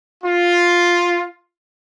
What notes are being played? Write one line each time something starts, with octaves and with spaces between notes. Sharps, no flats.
F4